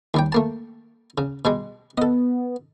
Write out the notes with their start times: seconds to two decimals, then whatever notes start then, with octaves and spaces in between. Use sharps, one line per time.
0.14 D#2 G3 G5
0.32 A3 A#3 A5
1.18 C#3
1.45 B2 G3 G#3
1.98 B3 A4 D#5